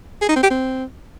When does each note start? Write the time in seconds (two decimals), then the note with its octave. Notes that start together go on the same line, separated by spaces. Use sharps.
0.21 G#4
0.29 D#4
0.36 C4
0.43 G4
0.50 C4